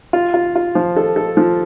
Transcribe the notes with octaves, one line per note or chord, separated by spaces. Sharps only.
F4
F4
F4
F3
A4
A4
F3